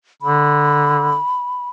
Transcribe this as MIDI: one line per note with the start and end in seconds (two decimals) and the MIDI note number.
0.22 1.17 50
0.22 1.69 83